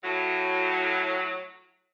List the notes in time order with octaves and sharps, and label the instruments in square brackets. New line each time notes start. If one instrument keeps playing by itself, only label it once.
[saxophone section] A2 F#3